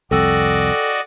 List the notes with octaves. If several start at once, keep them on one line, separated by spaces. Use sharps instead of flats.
C2 F2 F#4 A4 D5 D#5 G5 E6